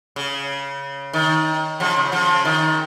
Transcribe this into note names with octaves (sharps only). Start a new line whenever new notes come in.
C#3
D#3
C#3 F3
C#3
C#3 F3
D#3